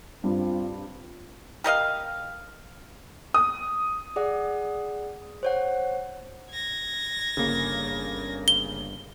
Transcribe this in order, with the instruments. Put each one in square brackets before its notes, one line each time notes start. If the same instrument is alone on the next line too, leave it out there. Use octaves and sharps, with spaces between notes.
[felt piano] G2 [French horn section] C4 F4
[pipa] G4 A#4 D#5 F5
[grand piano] D#6
[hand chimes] G#4 D5 F#5
C5 C#5 F#5
[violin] G#6 A#6
[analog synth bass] G1 [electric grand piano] C#3 A#3
[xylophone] G7